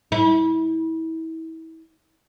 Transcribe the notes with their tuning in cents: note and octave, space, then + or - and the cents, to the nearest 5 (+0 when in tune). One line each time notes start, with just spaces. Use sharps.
E4 -30